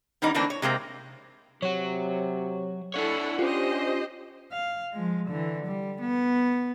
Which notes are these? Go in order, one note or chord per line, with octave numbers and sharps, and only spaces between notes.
D#3 E3 G3 B3 C#4 D#4
D3 E3 A3 A#3 C4 D4
C#5
C3 G#3 A#3 C4
C3 F#3 F#4 C#5
D4 E4 A4 C#5 F#5
C#4 F4 G4 C5 D#5
F5
F3 G#3
D3 E3
G3
B3